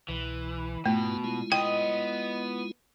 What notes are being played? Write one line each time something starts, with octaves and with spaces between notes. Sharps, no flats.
C2 B2 E3
G#2 B2 A3 E4 F4
G#3 E4 F4
B3 D#5 G5 C6